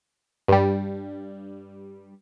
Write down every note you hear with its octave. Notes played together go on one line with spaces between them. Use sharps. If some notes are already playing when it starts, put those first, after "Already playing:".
G2 G3